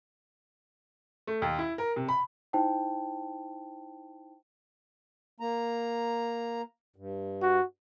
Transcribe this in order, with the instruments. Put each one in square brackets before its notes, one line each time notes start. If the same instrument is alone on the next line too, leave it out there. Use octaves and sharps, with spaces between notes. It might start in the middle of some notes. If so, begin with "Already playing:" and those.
[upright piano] A3
D#2
E4
A#4
C3
B5
[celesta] D#4 E4 C5 G5 A5
[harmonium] A#3 A#5
G2
[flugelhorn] F#4